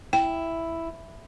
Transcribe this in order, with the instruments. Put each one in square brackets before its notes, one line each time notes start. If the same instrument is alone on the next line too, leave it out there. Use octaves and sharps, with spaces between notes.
[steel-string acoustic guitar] E4 [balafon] G5